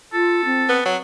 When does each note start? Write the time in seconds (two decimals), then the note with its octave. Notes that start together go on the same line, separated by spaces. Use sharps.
0.13 F4 A4
0.45 C4
0.69 B3
0.85 F#3